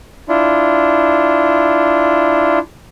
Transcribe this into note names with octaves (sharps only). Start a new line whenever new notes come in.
D4 E4 F4